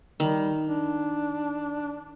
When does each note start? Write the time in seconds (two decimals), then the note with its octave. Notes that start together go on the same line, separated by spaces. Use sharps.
0.20 D#3 G3
0.67 D4